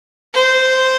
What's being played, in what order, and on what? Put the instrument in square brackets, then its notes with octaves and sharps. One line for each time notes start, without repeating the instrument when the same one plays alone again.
[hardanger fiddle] C5